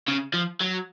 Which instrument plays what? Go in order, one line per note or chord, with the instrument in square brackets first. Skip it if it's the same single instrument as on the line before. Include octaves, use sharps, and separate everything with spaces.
[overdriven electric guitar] C#3
F3
F#3